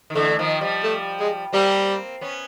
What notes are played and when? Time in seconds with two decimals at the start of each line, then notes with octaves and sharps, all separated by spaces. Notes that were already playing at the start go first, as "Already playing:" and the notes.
0.10 D#3
0.15 D3 E3 A3
0.39 D#3 F3
0.61 F3 G3
0.84 A3
1.19 G#3
1.53 G3 A#3 C4
2.21 B3 C#4